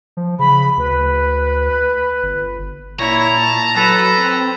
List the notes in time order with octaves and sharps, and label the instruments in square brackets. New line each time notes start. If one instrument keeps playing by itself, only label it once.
[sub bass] F3
[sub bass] C#3 [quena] B5
[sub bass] D2 [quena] B4
[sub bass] G1
[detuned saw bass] A#2 [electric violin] E4 C#5 [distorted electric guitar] A#5
[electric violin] A5
[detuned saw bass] F#3 [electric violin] A4 B4
[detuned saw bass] C4